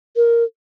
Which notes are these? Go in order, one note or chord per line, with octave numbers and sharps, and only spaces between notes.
A#4